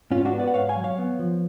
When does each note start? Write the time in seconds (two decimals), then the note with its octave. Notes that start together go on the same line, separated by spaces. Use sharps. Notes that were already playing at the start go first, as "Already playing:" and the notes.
0.11 G#2 C#4 F4
0.25 D4 F#4
0.33 B3
0.40 B4 D5
0.47 F#5
0.54 G#2 C#5 F5
0.69 F5 G#5
0.76 F#3
0.84 C#5 F5
0.98 B3
1.19 F3